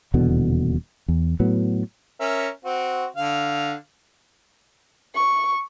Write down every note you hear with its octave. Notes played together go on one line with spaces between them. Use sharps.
D#1 E2 B2 D3
E2
A2 F#3 B3
C#4 A#4 E5
C4 F#4
D3 F5
C#6